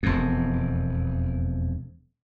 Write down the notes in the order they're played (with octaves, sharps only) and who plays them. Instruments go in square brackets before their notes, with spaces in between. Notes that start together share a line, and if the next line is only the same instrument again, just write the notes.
[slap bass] E1 F2